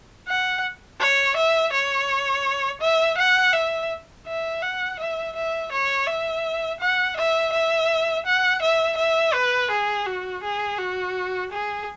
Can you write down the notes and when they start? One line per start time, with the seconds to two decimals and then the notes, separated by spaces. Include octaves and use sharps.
0.28 F#5
1.00 C#5
1.36 E5
1.72 C#5
2.81 E5
3.18 F#5
3.53 E5
4.27 E5
4.62 F#5
4.99 E5
5.35 E5
5.72 C#5
6.07 E5
6.80 F#5
7.16 E5
7.52 E5
8.25 F#5
8.62 E5
8.97 E5
9.33 B4
9.70 G#4
10.06 F#4
10.43 G#4
10.78 F#4
11.52 G#4